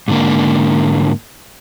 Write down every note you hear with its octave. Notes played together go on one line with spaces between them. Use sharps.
G#2 D3 A#3